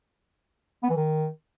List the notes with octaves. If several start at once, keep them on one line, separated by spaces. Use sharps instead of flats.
B3
E3
D#3